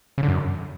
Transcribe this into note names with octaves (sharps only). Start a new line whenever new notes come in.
C#3
D3
F#2